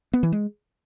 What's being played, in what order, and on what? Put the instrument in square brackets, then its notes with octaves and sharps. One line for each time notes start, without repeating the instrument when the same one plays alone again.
[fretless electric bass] B3
E3
G#3